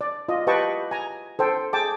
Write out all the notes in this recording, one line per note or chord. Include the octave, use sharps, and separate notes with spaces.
D5
F4 D#5
G4 B4 D#5 G5 A5 C#6
G#5 A#5
A4 C5 G5
G#4 G5 A5 D6